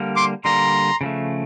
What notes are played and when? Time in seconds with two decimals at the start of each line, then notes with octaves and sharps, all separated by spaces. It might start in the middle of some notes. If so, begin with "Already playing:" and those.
Already playing: D3 G3 A#3
0.16 C6 D6
0.44 D3 G3 A#3 A#5 C6
1.01 C#3 F3 A3